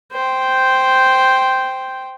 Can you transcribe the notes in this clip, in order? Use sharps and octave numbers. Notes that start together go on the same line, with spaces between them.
C5 G5